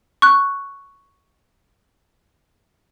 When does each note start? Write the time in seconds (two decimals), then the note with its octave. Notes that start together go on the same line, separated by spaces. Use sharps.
0.22 C#6 F#6